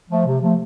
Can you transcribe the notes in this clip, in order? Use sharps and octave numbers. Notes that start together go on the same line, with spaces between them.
F3 A3
C3
F3 A3